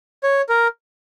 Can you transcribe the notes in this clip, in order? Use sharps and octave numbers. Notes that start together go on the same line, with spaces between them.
C#5
A#4